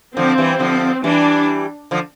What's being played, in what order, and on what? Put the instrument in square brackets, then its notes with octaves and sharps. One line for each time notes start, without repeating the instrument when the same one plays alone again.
[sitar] D3 F3 [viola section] C4
[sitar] E3 G3
D3 F3
[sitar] E3 G3 [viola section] D4
[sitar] D3 F3